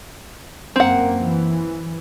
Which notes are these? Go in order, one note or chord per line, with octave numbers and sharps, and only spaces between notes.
F#2 A#3 C4 F#5
E3